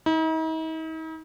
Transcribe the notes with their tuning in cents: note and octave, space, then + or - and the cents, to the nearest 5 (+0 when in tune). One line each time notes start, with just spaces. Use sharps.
D#4 +45